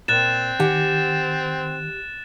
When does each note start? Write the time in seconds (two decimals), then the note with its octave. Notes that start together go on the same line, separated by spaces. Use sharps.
0.08 A#2 C4 F#6 A6 E7
0.60 D#3 G4 F#5 G#5